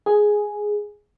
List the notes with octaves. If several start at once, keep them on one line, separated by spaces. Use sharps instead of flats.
G#4